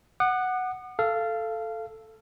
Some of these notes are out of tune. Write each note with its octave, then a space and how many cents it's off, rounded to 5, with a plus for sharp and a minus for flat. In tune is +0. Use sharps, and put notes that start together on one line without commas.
F#5 +0 D#6 -45
A4 +0 F5 -20